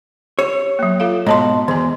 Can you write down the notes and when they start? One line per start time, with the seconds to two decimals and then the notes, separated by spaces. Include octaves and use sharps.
0.39 G4 C#5
0.79 F#3 A#3
1.00 F4 A4 F5
1.27 G#2 B2 C#5 A5 C6
1.68 E2 D#3 G#5